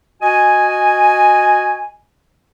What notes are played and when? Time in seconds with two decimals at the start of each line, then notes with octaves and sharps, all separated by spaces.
0.22 F#4 D#5 G#5